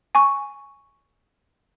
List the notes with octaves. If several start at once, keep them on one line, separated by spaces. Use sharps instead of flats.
G#5 C#6